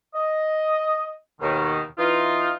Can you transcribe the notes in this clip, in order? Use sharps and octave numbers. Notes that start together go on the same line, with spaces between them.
D#5
D#2 B2 D#3
E3 D#4 F4